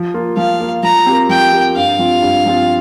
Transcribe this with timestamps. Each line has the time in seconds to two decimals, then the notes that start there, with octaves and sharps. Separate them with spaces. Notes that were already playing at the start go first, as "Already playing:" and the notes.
Already playing: F3
0.14 A#3 F4
0.37 F3 F5
0.60 A#3 F4
0.83 F3 A#5
1.06 C4 G4 A#4
1.29 F3 G5
1.53 C4 G4 A#4
1.76 G2 F5
1.99 F3 C4 F4
2.22 G2
2.46 F3 C4 F4